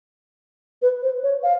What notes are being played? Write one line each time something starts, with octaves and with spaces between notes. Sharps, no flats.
B4
C5
C#5
F5